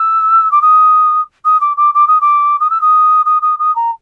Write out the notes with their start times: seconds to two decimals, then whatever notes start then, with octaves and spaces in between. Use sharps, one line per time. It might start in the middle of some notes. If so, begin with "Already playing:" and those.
Already playing: E6
0.51 D6
0.61 D#6
1.45 D#6
1.60 D6
1.77 D6
1.94 D6
2.07 D#6
2.21 D6
2.60 D#6
2.70 E6
2.81 D#6
3.25 D#6
3.42 D#6
3.59 D#6
3.75 A#5